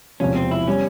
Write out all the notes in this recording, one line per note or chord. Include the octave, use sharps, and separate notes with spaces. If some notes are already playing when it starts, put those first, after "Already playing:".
E1 E2 C3 F3 C#4
C4
E4
G3 C#4